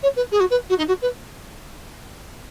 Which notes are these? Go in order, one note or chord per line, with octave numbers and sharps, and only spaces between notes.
C#5
B4
G#4
F#4
B4
F#4
D#4
F#4
B4